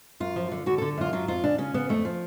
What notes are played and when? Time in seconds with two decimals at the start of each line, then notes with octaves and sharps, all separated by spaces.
0.20 F#2 F4
0.36 F3
0.52 D3
0.66 D3 F#4
0.78 D3 A4
0.98 F#2 F4
1.13 F#3 F4
1.28 F2 F4
1.44 C#3 D4
1.58 C#3 C#4
1.74 C#3 B3
1.89 F2 A3
2.05 F3